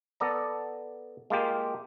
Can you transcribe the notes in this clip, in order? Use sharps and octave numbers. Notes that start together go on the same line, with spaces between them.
B3 A4 D5 A#5
G#3 A#3 F4 G4